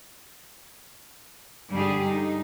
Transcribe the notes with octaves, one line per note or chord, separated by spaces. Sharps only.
G2 D3 G3 D4 G4 G#4
D#4